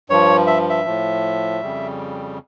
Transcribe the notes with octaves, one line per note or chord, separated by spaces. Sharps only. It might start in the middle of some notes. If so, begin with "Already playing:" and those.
G2 F3 C#5
E5
E5
A2 F3
F2 C#3 G3